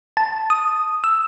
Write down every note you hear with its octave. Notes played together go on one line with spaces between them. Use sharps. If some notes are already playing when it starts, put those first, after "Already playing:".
A5
D#6
E6